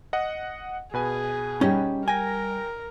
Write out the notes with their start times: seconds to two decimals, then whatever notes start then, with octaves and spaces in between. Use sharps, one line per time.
0.13 D#5 F#5
0.94 B2 G#4 B4 G#5
1.61 G3 C#4 D#4 G4
2.08 A#4 G5 G#5 A#6